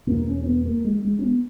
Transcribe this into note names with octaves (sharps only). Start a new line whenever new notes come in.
E2 B2 A#3
C#4
C#4
B3
A#3
G#3
G#3
C#4
B3